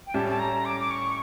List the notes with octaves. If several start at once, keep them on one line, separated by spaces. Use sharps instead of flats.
G5
A2 G3 C#4 G4 A5
A5
A#5
D6
D6
C#6